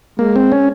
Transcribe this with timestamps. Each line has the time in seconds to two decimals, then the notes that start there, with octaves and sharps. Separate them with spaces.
0.19 G#3 A#3
0.36 C4
0.52 C#4